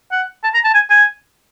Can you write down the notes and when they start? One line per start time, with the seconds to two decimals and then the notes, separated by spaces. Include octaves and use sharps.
0.12 F#5
0.43 A5
0.54 A#5
0.65 A5
0.74 G#5
0.90 G#5